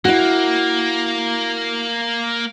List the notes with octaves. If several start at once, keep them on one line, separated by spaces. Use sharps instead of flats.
A#3 E4 F#4